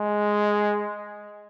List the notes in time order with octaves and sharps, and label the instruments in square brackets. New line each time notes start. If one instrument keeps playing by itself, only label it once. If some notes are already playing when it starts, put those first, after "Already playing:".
Already playing: [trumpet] G#3